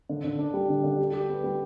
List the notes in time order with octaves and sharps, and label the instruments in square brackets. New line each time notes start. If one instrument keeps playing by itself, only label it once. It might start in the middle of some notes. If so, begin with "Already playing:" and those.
[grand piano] D3
D3
D4
G3
D3
D3
G4
G4
B3
G3